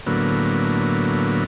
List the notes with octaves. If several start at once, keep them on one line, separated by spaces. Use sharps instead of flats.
A2 D3 F#3 A#3 B3